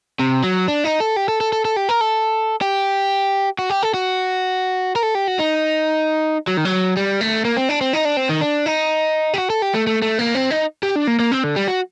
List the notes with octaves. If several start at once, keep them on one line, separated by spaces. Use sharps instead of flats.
C3
F#3
D4
D#4
A4
G4
A4
A4
A4
A4
G4
A#4
A4
G4
F#4
G4
A4
F#4
A#4
A4
G4
F#4
D#4
F#3
D#3
F#3
G3
A3
A#3
C4
D4
C4
D#4
D4
C4
D#3
D4
D#4
G4
F#4
A4
G4
A3
A3
A3
A#3
C4
D#4
G4
D4
A#3
A#3
C4
D3
G3
F#4